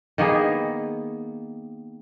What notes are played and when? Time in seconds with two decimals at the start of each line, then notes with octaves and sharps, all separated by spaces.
0.18 D#3 A#3 B3 G#4